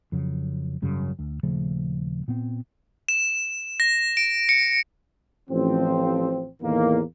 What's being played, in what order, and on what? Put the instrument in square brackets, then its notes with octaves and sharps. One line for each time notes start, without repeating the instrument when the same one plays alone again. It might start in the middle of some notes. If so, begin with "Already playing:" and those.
[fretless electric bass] F2 C#3 F#3
G#1 F#2 C#3 G3
D2
D#1 C#3 F3 A3
A#2 B3 C4
[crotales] E7
A#6
D7
C#7
[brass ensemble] A1 F3 C4
E2 A2 D#3 A#3